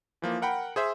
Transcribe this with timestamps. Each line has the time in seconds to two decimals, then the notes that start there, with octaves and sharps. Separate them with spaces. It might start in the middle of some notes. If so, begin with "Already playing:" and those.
0.22 E3 F3 A#3
0.42 A#4 F#5 G5 B5
0.76 G#4 C5 E5